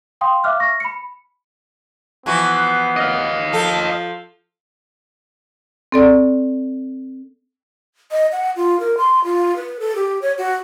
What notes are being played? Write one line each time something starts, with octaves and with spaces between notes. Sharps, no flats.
F5 G5 C6 D#6
E5 F5 D6 F6 F#6
C#6 F6 A#6
B5 C#7
E3 F3 B3 F#4
D#5 F5
F3 F4 A4
C4 A4 D5
D#5
F#5
F4
A#4
C6
F4
B4
A4
G4
C#5
F#4